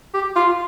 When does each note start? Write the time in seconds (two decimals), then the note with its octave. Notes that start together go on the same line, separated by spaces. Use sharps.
0.14 G4
0.36 F4